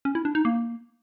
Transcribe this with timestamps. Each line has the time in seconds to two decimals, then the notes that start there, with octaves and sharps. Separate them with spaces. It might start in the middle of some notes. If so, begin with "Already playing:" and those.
0.05 C#4
0.15 E4
0.25 D4
0.35 D#4
0.45 A#3